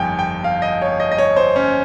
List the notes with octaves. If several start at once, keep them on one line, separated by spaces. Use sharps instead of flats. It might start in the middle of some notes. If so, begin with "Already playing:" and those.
Already playing: G1 F2 D#3 G5 G#5
G5
F5
D#5
C#5
D#5
D#5
C#5
C5
C#4